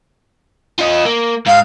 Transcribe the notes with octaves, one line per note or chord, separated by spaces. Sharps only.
F4 D#5
A#3
G#2 F5